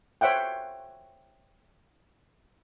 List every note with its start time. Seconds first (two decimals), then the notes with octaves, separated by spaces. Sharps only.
0.21 C5 C#5 E5 F#5 G5